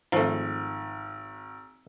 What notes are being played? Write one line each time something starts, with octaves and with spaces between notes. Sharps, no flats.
G#1 F3 A3